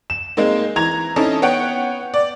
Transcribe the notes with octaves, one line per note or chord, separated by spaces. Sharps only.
E7
G#3 A#3 C4 D#4
E3 A#5 G#6 F7
C4 C#4 D#4 E4 A4 D#5
B3 C#5 F#5 G5
D5